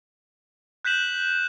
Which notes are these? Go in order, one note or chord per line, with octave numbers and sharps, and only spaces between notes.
F#6 G6 B6 E7 F#7